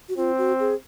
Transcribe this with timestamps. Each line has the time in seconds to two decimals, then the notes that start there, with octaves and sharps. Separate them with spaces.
0.09 F#4
0.17 C4 F4
0.38 F#4
0.60 G#4